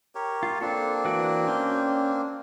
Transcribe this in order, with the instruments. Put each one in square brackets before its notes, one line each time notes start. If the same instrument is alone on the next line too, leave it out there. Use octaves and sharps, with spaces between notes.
[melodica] G4 A#4 C#5
[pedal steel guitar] F4
[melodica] A#3 C4 D4 [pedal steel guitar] A4
[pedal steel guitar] E3 F#4 D5
C#4 G5